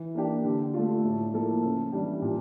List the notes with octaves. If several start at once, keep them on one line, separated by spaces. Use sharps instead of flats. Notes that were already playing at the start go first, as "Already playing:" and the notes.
Already playing: E3
A#3 D4 G4
D3
A3 D4 F4
A2
F3 A#3 E4 A4
C#3
E3 G3 D4 G4
A#2